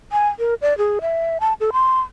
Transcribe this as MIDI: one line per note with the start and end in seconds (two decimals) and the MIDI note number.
0.12 0.29 80
0.39 0.54 70
0.62 0.76 74
0.78 0.99 68
1.01 1.38 76
1.40 1.53 81
1.60 1.70 69
1.73 2.00 84